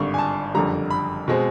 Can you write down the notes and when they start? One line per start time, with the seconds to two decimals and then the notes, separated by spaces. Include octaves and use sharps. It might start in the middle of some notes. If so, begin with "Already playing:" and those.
Already playing: G#1 G2 D3 C#6
0.14 G#5
0.18 A5
0.55 F#1 F2 D3 G3 A#5
0.90 B5
1.28 B2 G#3 C4